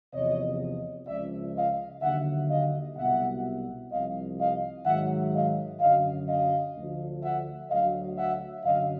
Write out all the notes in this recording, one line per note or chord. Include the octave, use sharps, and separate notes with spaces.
E2 C3 F3 C#5 D#5
C#2 C#3 F3 D5 E5
D#5 F5
D#2 D3 F#3 E5 F#5
D#5 F5
C2 B2 F#3 E5 F#5
C2 C3 F3 D#5 F5
D#5 F5
G#2 D#3 F#3 E5 F#5
D#5 F5
F#2 D3 F#3 D#5 F5
D#5 F5
D2 D3 F3
E5 F#5
D2 D3 F#3 D#5 F5
E5 F#5
F#2 D3 F#3 D#5 F5